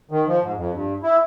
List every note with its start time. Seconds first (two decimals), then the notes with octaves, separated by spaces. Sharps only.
0.11 D#3
0.28 F3
0.43 G#2
0.57 F2
0.74 G2
1.03 E4